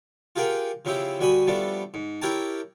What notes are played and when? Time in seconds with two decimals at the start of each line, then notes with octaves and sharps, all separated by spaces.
0.36 F4 G4 G#4 A#4 F#5 G5
0.85 C#3 F3 C4 E4 G4
1.19 D2 G3 F#4 G#5 B5 D#6
1.47 F3 G3 A3 B3 D4
1.94 G#2
2.22 E4 G4 A#4 C#5 G5 A5